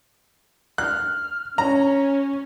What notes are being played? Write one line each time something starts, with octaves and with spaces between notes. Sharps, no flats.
F6 F#6
C#4 C#5 A#5